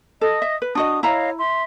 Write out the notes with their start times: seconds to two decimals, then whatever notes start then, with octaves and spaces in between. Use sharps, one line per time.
0.21 A4 D#5 D#6
0.42 E5
0.62 B4
0.75 D4 F#4 D#5 D#6
1.03 E4 C#5 D#5 F5 A#5
1.38 E5 C6